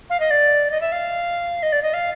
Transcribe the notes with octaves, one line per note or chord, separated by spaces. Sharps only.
F5
D#5
D5
D#5
E5
F5
D#5
D5
D#5
F5